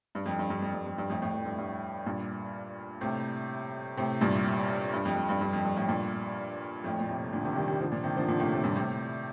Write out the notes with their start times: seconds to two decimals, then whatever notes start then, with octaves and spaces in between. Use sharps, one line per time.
0.15 G2
0.26 F2
0.39 G2
0.50 G2
0.62 F2
0.74 G2
0.87 F2
0.98 G2
1.10 F2 A2
1.22 F2 A2
1.34 F2
1.46 G2
1.58 G2
2.06 G2 A#2
3.01 A2 C3
3.97 A2 C3
4.21 G2 A#2
4.93 G2
5.05 F2
5.17 F2
5.29 G2
5.41 G2
5.53 F2
5.65 G2
5.77 F2 A2
5.89 G2 A#2
6.84 F2 A2
7.00 A#2
7.08 A2 C3
7.33 A#2 D3
7.44 C3 D#3
7.56 D#3 G3
7.68 D#3 G3
7.81 D3 F3
7.92 A#2 D3
8.04 C3 D#3
8.17 D3 F3
8.28 A#2 D3
8.40 A2 C3
8.52 A2 C3
8.64 G2 A#2
8.76 A2 C3